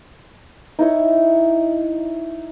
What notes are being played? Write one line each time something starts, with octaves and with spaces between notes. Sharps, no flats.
D#4 E4 C#5